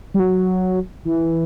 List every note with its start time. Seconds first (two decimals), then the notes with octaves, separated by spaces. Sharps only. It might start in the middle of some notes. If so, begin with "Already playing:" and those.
0.14 G3
0.20 F#3
1.05 E3